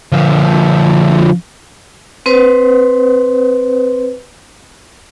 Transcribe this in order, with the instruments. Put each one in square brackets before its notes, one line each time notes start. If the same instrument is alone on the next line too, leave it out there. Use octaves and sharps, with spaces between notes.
[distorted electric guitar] D3 F3
[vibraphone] C4 B4 C5